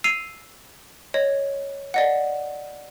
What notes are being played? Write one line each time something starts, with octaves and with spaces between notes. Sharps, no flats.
E6 C7 D#7 F7
C#5 D#5
D5 D#5 F#5